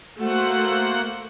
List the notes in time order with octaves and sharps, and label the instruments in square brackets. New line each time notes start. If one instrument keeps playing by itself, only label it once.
[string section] A3 [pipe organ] A#3 C5 F#5 [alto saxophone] F#4